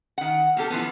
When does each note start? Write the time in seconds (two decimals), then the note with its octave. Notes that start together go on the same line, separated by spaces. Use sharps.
0.18 D#3 F#5
0.57 A#3 G4 A4
0.70 E3 F3 B3